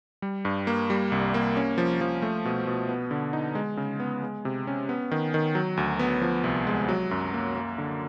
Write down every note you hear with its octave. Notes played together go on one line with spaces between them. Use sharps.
G3
G2
A#3
G3
C2
A#3
C#4
F3
F3
A3
B2
B2
B3
D3
D#4
G#3
C#3
B3
G#3
C3
C#4
B3
D#3
D#3
F#3
D2
B3
F3
C2
G#3
F#3
F#2
A#3
A#3
D3